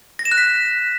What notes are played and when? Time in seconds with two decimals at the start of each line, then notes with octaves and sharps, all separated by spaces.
0.19 A#6
0.25 E7
0.31 F#6
0.38 B6